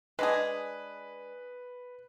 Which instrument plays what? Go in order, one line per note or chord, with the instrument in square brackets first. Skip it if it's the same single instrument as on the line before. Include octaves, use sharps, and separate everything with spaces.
[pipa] G#3 D4 G#4 [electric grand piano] B4